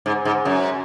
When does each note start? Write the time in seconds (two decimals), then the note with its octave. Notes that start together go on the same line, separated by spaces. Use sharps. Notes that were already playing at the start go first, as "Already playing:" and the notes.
0.06 G#2
0.25 G#2
0.45 F#2